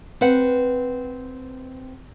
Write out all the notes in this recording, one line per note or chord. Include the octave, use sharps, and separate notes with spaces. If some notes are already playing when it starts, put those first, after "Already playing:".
C4 B4 F#5